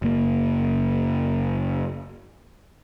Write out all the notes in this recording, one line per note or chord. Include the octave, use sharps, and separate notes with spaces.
F#1 A#3